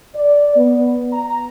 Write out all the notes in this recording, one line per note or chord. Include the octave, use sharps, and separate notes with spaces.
D5
B3
A#5